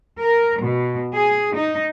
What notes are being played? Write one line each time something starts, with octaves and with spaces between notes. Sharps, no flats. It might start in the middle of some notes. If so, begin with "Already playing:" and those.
A#4
B2
G#4
D#4